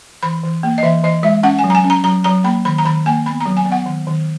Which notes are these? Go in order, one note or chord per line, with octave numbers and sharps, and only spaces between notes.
E3 B5
E3
A#3
D#5
E3 E5
E3 D#5
G#3 E5
C#4 F#5
G#5
F#3
A#5
G#5
C#4
A#5
F#3 A#5
F#3 A#5
A#3 B5
D#3 B5
A#5
D#3 B5
A#3 G#5
B3 B5
A#5
F#3
G#5
B3
F#5
D#3
D#3